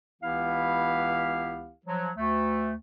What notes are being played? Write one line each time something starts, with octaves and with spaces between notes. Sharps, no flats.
C#2 E3 B3 E4 G4 F5
F3 F#3
D2 A3